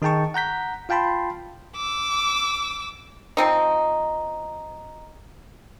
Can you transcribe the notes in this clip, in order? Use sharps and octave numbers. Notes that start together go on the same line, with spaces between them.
D#3 D#4 G#4 G5 A5 C#6
F#5 A#5 G6 B6
F4 F5 G5 A5 B5 C6
D6 E6
F3 C4 D#4